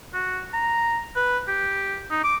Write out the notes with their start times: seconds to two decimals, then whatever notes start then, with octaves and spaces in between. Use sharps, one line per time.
0.14 F#4
0.53 A#5
1.16 B4
1.48 G4
2.11 D#4
2.24 D6